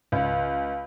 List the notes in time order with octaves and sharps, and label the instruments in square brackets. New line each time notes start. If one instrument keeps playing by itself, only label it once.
[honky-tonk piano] C#2